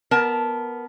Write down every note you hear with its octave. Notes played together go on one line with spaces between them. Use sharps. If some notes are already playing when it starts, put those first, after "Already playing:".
B3 A#4 A5